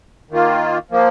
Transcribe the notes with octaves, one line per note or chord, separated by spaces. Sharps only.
D#3 A#3 F4
F3 A#3